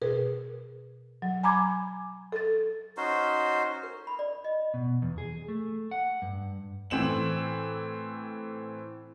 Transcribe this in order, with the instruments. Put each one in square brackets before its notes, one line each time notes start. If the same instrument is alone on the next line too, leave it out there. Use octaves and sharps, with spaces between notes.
[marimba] B2 G#4 A#4 B4
F#3
G#5 A#5 B5 D6 G#6
A4 A6
[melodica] C#4 D#4 F#4 C5
[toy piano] A#4
B5
D5
D#5
[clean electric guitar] B2
E2
G#4
A3
F#5
G2
[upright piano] A2 E3 C4 E7 F#7